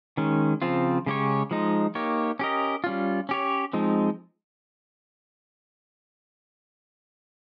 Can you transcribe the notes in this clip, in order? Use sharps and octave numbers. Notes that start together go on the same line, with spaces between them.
D#3 G#3 C#4
C#3 F3 C4 F4
C#3 G#3 C#4 G4 C#5
F3 G#3 D#4
A#3 D#4 G4 C#5
C#4 G4 A#4 D#5
G3 C#4 F4
C#4 G4 C#5
F3 G#3 C4 D#4